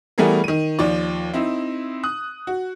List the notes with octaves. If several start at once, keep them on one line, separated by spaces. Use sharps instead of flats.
E3 G3 A3 B3 G#4 A#4
D#3 D#7
D#2 F3 D5
C4 D#4 E4
D#6 F#6
F#4